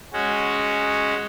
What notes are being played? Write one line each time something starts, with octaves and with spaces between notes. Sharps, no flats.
G#3 C#4 F#4